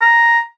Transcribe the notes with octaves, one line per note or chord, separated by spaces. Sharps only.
A#5